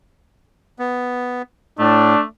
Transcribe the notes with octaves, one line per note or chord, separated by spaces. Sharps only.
B3
A2 A3 D4